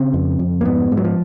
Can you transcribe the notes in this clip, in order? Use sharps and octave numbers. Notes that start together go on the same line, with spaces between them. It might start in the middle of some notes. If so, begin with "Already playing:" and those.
Already playing: C#3 C4
F2
F2
A#3
G#2 B3
G#2
F#3
F3